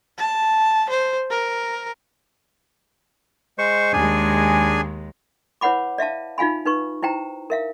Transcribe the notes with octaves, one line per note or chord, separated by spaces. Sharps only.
A5
C5
A#4
G#3 C5 C#6
D#2 G#3 D4 G#4 G#5
E4 B4 C#5 F#5 B5 D6
D5 E5 F5 A5
D#4 F4 F5 G#5 B5
D#4 B4 C#6
E4 C5 G5 A#5
A#4 E5 F5